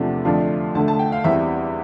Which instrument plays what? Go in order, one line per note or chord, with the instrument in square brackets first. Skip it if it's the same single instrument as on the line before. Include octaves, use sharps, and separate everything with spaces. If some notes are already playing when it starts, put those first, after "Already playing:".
Already playing: [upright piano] E2 C3 F3 A3 D4
F2 D3 A3 D4 F4
D2 D3 A3 A5
A5
G5
F5
E2 E3 G3 C4 E5